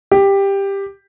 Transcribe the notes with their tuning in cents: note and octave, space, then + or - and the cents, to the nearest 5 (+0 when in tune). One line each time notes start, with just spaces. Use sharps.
G4 +10